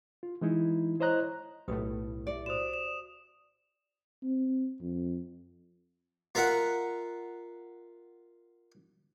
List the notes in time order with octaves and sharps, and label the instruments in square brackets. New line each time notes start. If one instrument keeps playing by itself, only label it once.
[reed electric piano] F4
E3 G#3 D#4 E4
E4 C5 C#5 D#5 A#5 F#6
[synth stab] B1 A2 [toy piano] G4 B4 D#6
[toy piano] G4 E5 [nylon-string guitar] D5
[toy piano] F#4 C5 [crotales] D#6 E7
[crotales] E7
[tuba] C4
F2
[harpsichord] F4 A#4 E5 F#5